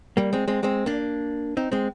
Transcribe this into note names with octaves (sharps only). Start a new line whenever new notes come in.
G3 A#3
G#3 C4
G#3 C4
G#3 C4
A#3 D4
C4 D#4
G#3 C4